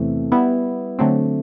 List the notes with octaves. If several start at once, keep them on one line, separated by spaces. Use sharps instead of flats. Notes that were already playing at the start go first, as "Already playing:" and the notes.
Already playing: E2 C3 E3 A3 C4
G3 B3 E4
D3 F#3 A3 C4